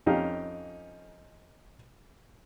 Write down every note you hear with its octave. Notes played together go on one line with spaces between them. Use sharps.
F2 C#4 D#4 G4 F5